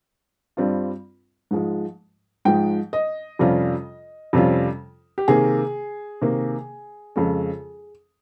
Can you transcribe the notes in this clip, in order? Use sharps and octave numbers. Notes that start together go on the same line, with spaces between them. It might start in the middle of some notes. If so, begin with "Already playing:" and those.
G2 G3 C4 F4
G#2 F3 G#3
G#2 F3 G#3 G5
D#5
F2 C3 G3 C#4 F4
F2 C3 G3 C#4 F4
G4
C3 D#3 A#3 G#4
C3 D#3 A#3
F2 C#3 G#3 C#4